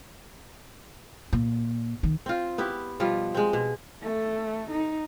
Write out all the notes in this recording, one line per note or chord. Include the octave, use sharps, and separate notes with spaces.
A#2
D#3
C4 F4
B3 E4 G4
B2 F3 G3 F4
G#3 C4
B2
A3 A4
D#4